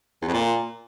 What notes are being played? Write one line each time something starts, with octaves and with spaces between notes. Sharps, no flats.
E2
F2
A#2